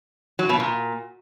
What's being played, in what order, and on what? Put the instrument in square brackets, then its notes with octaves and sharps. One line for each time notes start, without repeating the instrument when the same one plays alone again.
[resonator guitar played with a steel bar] F#3
B2
A#2